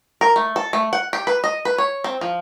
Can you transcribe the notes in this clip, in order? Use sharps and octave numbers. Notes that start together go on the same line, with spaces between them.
A#4
A3
A4
A3
F#5
G4
B4
D#5
B4
C#5
C4
F3